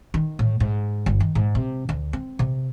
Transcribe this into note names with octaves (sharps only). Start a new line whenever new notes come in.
D#3
A2
G#2
G1
D#3
G#2
C3
D2
C4
C3